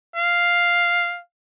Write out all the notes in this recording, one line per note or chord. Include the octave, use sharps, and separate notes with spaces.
F5